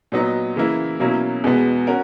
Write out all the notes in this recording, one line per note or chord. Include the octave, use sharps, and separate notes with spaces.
A#2 F#3 B3 D#4
C#3 E3 A#3 E4
B2 F#3 A#3 C#4 E4
E2 B2 G#3 B3
C#4 F#4 A#4